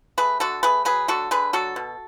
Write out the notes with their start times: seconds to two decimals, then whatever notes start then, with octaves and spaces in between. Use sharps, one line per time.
0.18 A3 G#4 B4
0.40 D3 F#4 A4
0.63 A3 G#4 B4
0.85 F#3 G#4 B4
1.08 D3 F#4 A4
1.31 D3 G#4 B4
1.53 F#3 F#4 A4
1.76 B2